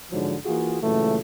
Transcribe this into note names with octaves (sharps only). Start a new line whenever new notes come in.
G#2 D3 F3 F#3
E3 A#3 F4 F#4 G#4
A#2 C#3 E3 F#3 G#3 A3